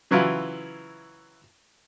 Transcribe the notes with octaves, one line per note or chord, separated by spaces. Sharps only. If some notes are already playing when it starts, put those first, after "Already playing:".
C#3 E3 F#3 E4 F4